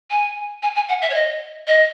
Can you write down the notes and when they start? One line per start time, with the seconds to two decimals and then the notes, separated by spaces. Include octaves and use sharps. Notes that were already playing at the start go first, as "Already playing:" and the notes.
0.11 G#5
0.62 G#5
0.75 G#5
0.88 F#5
1.02 E5
1.10 C#5
1.14 D#5
1.67 D#5